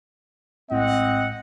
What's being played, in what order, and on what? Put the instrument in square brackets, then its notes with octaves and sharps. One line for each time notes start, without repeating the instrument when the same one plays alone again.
[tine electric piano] A#1 A2 G#3 [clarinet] C4 [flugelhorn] D#5 [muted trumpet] F#5